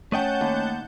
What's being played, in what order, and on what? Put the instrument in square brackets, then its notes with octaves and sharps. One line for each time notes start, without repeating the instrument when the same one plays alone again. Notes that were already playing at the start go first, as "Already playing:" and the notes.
[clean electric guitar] A3 D#5 G5 [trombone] C#4 [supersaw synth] F#5 A5 G6
[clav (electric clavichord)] D#2